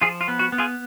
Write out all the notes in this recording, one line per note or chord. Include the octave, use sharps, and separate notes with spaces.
F3 F4 G#4
F4
B3
F#4
B3
F4 G#4